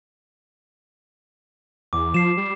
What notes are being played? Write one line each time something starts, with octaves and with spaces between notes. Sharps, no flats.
E2 D6
F3 C7 E7
G3